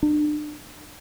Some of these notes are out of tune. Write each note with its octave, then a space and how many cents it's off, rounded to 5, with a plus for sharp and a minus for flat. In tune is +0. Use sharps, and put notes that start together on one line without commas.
D4 +35